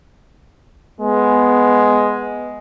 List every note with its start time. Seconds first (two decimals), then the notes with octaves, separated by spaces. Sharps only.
1.01 G#3 B3